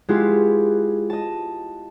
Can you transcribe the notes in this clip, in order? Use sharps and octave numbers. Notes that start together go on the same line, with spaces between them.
G#3 B3 E4 F4 G4
D#5 A5